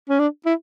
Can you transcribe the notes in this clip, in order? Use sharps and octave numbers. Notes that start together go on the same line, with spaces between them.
C#4
D4
E4